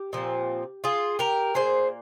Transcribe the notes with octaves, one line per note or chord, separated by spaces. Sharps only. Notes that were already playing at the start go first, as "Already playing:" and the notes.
Already playing: G4
A#2 F3 C4
F4 G#4
G4 A#4
A#2 F3 A#3 G#4 C5